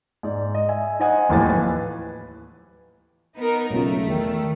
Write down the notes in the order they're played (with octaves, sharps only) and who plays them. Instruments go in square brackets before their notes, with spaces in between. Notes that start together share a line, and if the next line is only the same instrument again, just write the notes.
[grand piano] G#2 D5
D#5
E5 G#5
D#4 C5 D#5 F#5 G#5 D#6
D1 D#2 A2 E3 F3 A6
B4
[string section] B3 D#4 A#4
[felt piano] B1 C#3 F4 [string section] A3
[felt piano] E2 [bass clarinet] D#3